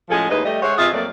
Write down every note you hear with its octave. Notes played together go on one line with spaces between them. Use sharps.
A2 F3 G#3 C#4 G#4 A4
D#2 A2 G#3 D#4 B4 D#5
G3 A3 D#5
G#3 C5 C#5 E5 F#5
C3 F4 G#4 D#5 E5
F2 F#3 A3 A#3 D5